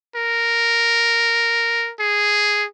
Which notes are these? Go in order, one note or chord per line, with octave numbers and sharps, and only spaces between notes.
A#4
G#4